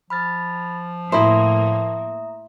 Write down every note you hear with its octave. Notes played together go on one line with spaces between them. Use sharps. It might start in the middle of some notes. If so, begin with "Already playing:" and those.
F3 B5 F6 A6
A2 A#3 E4 C5 E5 A#5 D#6